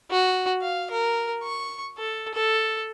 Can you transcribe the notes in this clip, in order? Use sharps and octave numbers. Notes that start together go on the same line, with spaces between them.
F#4
F5
A#4
C#6
A4
A4